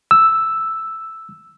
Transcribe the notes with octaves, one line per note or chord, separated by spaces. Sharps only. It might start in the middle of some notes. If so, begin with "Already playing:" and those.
E6